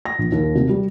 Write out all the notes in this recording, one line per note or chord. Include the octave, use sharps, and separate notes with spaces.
A#6
A#1
D#2
C3
G3